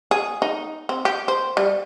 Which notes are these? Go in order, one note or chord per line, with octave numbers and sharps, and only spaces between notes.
G#4
D#4
C4
G4
C5
G3